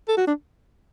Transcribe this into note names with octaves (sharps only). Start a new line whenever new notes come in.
A4
F#4
D4